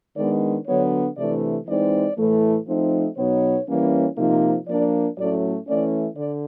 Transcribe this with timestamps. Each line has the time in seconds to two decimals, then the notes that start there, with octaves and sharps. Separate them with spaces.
0.17 D#3 G#3 B3 D4 D5
0.66 D3 F#3 B3 D4 C#5
1.17 C3 E3 A3 D4 D5
1.67 E3 G#3 C4 D#4 D5
2.17 A2 E3 A3
2.67 F3 A3 C4 D#4
3.16 B2 F#3 B3 D#4 C#5
3.67 E3 G3 A#3 C#4
4.17 C3 F3 A#3 D#4
4.67 F3 A#3 D4 D5
5.17 A2 F#3 A3 C#4 D5
5.67 E3 A3 C#4 D5
6.17 D3 D5